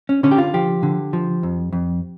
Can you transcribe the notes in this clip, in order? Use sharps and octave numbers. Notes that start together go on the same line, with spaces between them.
C#4
D3 C#4
G4
F4
F3 G4
D3
F3
F2
F2